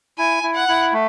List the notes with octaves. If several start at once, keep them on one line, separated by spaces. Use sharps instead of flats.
E4 G#5
E4
F#5
E4
A3